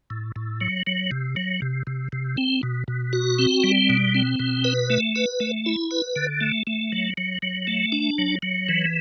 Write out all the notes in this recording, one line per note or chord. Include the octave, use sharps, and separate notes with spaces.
A2
A2
F#3
F#3
C3
F#3
C3
C3
C3
C4
B2
B2
F#4
C4
G3
B2
C4
B2
B4
A3
B4
A3
E4
B4
D3
A3
A3
F#3
F#3
F#3
A3
D4
F#3
F#3
E3